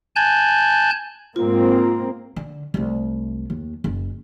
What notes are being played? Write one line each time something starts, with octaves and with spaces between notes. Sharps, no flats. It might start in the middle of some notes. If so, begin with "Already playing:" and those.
G#5 A5 F#6 G6
G#2 A#3 C4 F4
D3
C2 A3
D#2
F#1